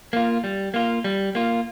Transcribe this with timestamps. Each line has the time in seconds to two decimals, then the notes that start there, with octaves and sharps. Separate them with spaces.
0.13 A#3 F4
0.44 G3
0.74 A#3 F4
1.04 G3
1.35 A#3 F4